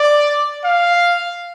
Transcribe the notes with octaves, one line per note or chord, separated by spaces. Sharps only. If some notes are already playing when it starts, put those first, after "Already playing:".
Already playing: D5
F5